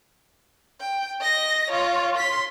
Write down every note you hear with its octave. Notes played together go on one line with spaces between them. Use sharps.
G5
D#5 A#6
F4 C#5
C6 B6